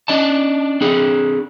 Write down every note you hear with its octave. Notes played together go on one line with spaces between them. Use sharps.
C#4 D4 D#5 A5
C4 D4 G#4